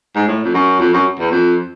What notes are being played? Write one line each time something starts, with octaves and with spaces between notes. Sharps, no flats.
G#2
A2
F2
F#2
F2
F#2
E2
F2